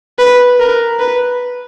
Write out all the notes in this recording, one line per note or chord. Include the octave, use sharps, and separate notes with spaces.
B4
A#4
B4